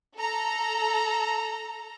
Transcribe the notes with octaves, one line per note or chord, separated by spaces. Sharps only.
A4 A#5